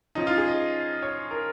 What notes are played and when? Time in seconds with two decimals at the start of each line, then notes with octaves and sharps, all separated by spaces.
0.15 F3 C#4 D#4
0.27 F4
0.38 G#4
0.48 D#5
1.02 C#5
1.31 A#4